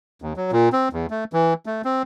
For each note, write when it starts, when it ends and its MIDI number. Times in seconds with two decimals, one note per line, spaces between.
0.22 0.33 39
0.37 0.51 54
0.52 0.69 46
0.73 0.89 60
0.93 1.07 40
1.10 1.24 57
1.33 1.54 52
1.66 1.82 57
1.85 2.03 60